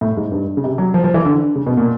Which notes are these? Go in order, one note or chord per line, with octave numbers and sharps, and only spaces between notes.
A2
G#2
G2
C#3
C3
F#3
F3
F3
E3
D3
C#3
B2
A#2